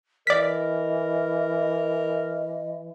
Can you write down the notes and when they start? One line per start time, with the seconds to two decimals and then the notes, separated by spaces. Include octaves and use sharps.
0.27 E3 A#4 D5 D#5 B6